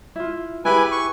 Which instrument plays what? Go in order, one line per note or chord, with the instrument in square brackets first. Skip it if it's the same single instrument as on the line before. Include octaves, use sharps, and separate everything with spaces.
[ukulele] E4 F4
[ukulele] E4 G4 G#4 [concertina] B4 G#5
[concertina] C#6